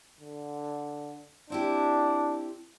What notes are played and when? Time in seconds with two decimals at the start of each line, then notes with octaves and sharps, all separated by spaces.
0.20 D3
1.50 C4 D4 E4 G4